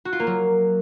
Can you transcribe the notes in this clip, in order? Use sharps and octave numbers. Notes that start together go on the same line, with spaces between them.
F#4
F4
A#3
F#3